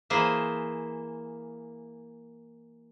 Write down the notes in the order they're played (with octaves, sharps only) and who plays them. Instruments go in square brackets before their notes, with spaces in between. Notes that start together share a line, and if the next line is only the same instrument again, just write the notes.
[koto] E3 A#3 G#4 C5 E5